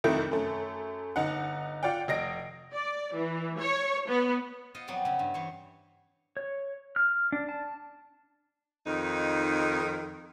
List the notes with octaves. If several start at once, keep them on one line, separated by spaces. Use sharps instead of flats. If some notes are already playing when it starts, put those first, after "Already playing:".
F2 C3 D#3 A3 E4
F#2 A3
G1 D#4 F#5
F4 D5 F#5 G5
F1 D#5 A#6 D7
D5
E3
C#5
B3
F4 C5 D#5 F#5
F2 F#3 B3 C4 D5 C6
C#3 E4
G2
E3 C5 C#5
C#5
F6
D4
A5
F2 D#3 D#4